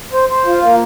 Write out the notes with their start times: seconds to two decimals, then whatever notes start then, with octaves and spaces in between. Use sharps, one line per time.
0.13 C5
0.29 C5
0.46 F4
0.62 A#3